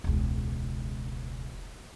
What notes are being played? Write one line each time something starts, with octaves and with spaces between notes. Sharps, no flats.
E1 C#2